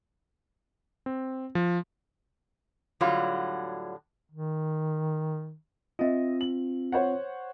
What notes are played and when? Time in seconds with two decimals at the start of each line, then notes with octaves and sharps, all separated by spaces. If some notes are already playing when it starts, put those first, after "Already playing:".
1.06 C4
1.55 F3
3.01 A2 D3 F#3 G3 F4
4.31 D#3
5.99 C4 F4 D#5 E5
6.41 F#7
6.92 C5 C#5 F#5